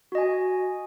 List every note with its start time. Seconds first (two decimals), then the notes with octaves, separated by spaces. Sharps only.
0.12 F#4
0.15 D#5
0.18 G#5